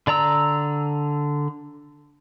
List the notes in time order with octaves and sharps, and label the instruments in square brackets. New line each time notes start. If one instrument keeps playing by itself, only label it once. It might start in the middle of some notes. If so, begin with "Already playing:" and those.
[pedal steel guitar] D3 D5 A#5 E6